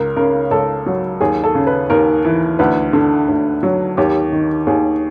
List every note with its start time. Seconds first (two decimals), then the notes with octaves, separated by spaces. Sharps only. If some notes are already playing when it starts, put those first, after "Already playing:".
Already playing: C#2 A#4
0.16 C#3 A#4
0.51 C#2 A4
0.86 F#3
1.21 D#2 G#4
1.44 A4
1.55 C#3
1.67 B4
1.90 D#2 A#4
2.25 E3
2.59 D2 B4
2.93 D3
3.29 D2
3.63 F#3
3.97 D#2 G4
4.32 D#3
4.67 D#2 G#4